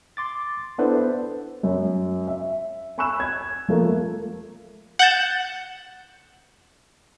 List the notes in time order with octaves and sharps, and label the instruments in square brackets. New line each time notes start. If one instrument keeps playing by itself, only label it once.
[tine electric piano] C6 D6 A6
B3 D4 E4 A4 B4 C5
[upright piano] F#2
E5
G#5 B5 C#6 E6 F#6 E7
G#6
F3 A3 A#3
[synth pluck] F#5 F#6 G6 A6 E7